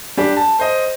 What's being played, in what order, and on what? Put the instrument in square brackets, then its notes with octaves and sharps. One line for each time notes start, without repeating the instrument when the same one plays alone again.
[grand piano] G3 D4 G4
A5
C5 D#5